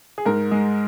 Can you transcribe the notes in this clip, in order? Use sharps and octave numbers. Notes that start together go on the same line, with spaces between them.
G#4
G#2 A#4
G#3